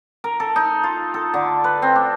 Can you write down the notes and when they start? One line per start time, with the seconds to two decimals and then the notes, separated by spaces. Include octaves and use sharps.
0.24 A#4
0.40 A4
0.56 D#4
0.83 F4
1.14 A4
1.34 D3
1.64 B4
1.82 C4
1.96 D4